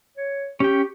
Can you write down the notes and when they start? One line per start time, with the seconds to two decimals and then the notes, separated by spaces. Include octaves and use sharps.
0.17 C#5
0.60 C#4 G4 G5